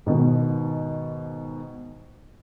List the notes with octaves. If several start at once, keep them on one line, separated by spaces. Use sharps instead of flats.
G#2 B2 D#3